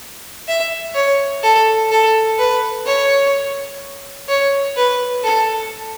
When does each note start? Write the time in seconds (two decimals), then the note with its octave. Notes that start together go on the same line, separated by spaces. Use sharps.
0.48 E5
0.95 C#5
1.43 A4
1.91 A4
2.38 B4
2.86 C#5
4.28 C#5
4.76 B4
5.24 A4